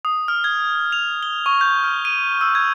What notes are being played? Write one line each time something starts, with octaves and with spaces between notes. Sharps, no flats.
D#6
F6
G#6
F7
G7
C#6
G6
F6
D#7
E6
G#6